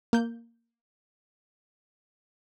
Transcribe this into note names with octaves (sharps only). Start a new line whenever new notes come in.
A#3 G6